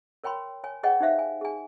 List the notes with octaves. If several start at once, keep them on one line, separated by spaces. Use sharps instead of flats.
A#4 C#5 G5 B5 C6
C#5 G#5
G#4 B4 C#5 D#5 F#5 G5
D#4 G4 C5 E5 F5
G#5
G#4 G#5